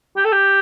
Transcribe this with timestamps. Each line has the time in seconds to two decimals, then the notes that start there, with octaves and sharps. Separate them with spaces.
0.17 G4
0.25 A4
0.32 G4